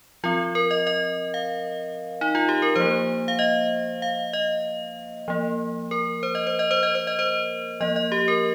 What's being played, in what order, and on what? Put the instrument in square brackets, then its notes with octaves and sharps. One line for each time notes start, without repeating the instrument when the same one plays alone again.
[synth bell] F3 C4 F4
A#4
D#5
D#5
F5
D#4
F4
G4
A#4
F3 A#3 C5
F5
D#5
F5
D#5
F3 A#3
A#4
C5
D#5
C5
D#5
C5
D#5
C5
D#5
C5
F3 A#3 D#5
D#5
G4
A#4